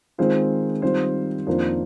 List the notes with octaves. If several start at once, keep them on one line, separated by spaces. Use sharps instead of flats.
D#3 G#3 C4 F4 C5
D#3 G3 C4 F4 C5
F2 D#3 A#3 D4 F4 C5